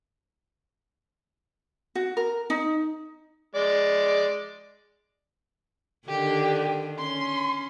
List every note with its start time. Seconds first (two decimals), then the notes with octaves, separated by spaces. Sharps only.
1.95 F#4
2.17 A#4
2.50 D#4
3.55 G#3 D5
6.08 D3 D#3 D4 G4
6.99 C#4 C6